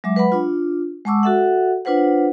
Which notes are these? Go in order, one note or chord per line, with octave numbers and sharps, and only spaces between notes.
F#3 G#3 E5 D6
B4 F#5 B5
D4 F4
G#3 F#5 A5 C#6 D6 E6
F#4 A4 E5 F#5
D4 F4 B4 C5 F#5